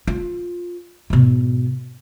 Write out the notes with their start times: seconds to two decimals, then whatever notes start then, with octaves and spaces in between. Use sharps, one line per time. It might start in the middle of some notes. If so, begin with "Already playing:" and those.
0.07 F4
1.10 G#2 B2